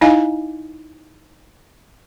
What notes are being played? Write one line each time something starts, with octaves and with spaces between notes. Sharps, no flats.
D#4 E4 D#5 F5 G#5